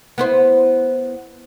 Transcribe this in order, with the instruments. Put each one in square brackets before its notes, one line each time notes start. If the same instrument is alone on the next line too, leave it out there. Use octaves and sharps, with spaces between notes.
[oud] B3 E4 C5